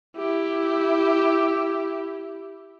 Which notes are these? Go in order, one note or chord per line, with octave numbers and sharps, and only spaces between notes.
E4 G4